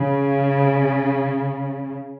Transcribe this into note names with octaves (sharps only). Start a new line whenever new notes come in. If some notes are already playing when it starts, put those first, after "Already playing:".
Already playing: C#3